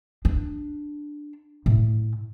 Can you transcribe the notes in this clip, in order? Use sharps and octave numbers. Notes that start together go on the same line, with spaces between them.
D4
A2